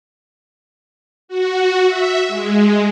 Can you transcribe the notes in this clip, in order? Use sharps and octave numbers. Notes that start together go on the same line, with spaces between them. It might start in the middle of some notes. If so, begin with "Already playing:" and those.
F#4
E5
G#3